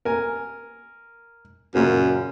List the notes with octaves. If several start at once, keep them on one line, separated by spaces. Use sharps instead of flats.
A#4 G#5
F#2 A#2 C#3 A#3